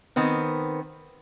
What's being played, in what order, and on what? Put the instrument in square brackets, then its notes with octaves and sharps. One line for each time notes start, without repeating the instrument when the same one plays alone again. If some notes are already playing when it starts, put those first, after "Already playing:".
[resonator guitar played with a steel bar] D#3 B3 C4